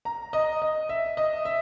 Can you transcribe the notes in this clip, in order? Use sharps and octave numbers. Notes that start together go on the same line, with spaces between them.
A#5
D#5
D#5
E5
D#5
E5